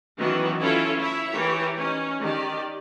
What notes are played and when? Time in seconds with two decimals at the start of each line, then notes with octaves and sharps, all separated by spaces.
0.17 D#3 E3 F#3 B3 C#4 F#4
0.60 C#4 E4 F4 A4 C#5 E5
0.98 E4 C#5 E5
1.32 E3 G4 A#4 C#5
1.77 C#4 D#4
2.21 D#3 G4 D5